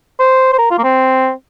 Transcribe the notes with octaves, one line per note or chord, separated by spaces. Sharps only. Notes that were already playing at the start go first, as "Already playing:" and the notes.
C5
C5
A#4
F4
A#3
C4